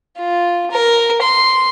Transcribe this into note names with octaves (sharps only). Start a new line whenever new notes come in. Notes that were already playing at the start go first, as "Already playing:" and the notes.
F4
A#4
C6